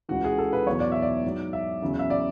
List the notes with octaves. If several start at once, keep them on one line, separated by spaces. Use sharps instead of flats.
C#2 C#3 E3 F#4
G#4
A4
B4
E2 B2 F#3 C#5
D5
E5
D5
G#2 F#3
E5
E2 C#3 F#3
E5
D5